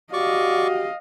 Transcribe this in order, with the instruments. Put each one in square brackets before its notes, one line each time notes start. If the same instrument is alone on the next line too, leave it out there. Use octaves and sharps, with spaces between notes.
[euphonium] F#4 [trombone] G4 [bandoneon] D5 C#6 D6 [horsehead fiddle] D#5 F5